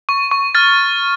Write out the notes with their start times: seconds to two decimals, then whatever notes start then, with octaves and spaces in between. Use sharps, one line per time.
0.09 C#6
0.31 C#6
0.55 F6 A6